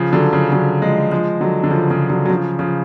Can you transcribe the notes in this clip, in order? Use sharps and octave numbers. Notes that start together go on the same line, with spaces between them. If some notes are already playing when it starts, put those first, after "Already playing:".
Already playing: C#3 F3
D3 F#3
C#3 F3
D3 F#3
F3 G#3
F3 G#3
D3 F#3
D3
C#3 F3
C#3 F3
D3 F#3
F#3
C#3 F3
C#3 F3